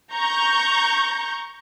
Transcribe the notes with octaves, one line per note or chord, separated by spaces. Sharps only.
A#5 C#6 G6